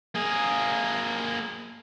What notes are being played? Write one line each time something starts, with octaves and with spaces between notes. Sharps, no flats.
A#3 G#4